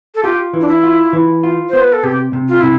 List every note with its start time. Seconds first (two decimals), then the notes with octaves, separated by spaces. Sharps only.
0.15 A4
0.23 F4 G4
0.53 E3
0.61 D4
0.68 E4
0.83 F4
1.13 E3
1.43 F4
1.69 B3 C5
1.81 B4
1.93 A4
2.03 C3 G4
2.33 C3
2.48 F4
2.60 C3 E4